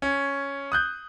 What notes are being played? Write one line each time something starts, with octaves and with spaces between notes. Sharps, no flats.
C#4
D#6 F#6 G6